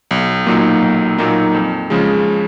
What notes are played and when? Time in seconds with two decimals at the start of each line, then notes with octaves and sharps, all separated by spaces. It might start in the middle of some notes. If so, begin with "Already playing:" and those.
0.11 B1
0.47 A#2 F#3 A#3 D#4
0.82 B1
1.18 A#2 F#3 A#3 D#4
1.54 F2
1.90 C#3 F3 G#3